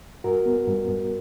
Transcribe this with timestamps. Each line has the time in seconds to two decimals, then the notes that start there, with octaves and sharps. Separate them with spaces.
0.24 G2 F#4 A#4
0.46 B3
0.67 G2
0.88 G2